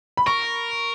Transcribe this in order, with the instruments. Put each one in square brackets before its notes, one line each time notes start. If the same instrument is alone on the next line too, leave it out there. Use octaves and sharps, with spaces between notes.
[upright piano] B5
[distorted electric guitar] A#4 [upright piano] C#6